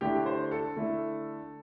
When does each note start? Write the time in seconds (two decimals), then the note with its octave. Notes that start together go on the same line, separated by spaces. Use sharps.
0.01 D3 A3 E4 G4
0.26 C5
0.51 A4
0.76 D3 A3 E4